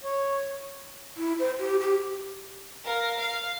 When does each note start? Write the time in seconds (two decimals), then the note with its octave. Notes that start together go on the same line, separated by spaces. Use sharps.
0.04 C#5
1.17 E4
1.39 C5
1.59 G4
1.80 G4
2.85 A#4 F5
3.18 F5